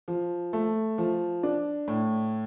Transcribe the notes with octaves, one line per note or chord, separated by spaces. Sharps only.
F3
A3
F3
D4
A2